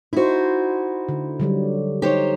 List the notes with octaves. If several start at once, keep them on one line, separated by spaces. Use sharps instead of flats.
D#4 E4 F#4 C5
D3
D3 F#3 G3
D#4 G4 C5 C#5